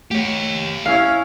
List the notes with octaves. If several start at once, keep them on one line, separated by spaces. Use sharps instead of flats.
A3 G4 C#5
C#4 E4 F5